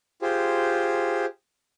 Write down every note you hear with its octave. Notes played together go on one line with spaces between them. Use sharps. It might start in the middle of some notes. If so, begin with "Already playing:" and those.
F4 G4 G#4 C5